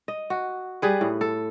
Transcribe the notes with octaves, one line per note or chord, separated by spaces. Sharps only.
D#5
F#4
G3 G#4 B4
A2
A4